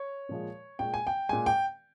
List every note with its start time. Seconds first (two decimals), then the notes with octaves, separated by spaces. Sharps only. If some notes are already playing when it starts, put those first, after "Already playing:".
Already playing: C#5
0.29 A#2 F3 G#3
0.79 A#2 G#3 G5
0.94 G#5
1.07 G5
1.29 A#2 G#3 G#5
1.46 G5